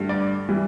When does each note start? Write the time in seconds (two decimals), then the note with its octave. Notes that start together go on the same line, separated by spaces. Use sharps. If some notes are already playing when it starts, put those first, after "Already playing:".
Already playing: G2 D3 A3
0.09 D5
0.49 E3 G3